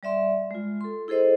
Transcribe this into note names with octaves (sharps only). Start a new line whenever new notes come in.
G3 D5 E5 C6
G#3 F4
A4 C6
E4 G#4 A4 C5 D#5